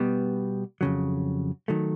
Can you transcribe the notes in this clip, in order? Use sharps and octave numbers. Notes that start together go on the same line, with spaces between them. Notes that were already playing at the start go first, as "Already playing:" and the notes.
Already playing: B2 G3 B3
F2 C#3 F#3
D#3 F#3 A3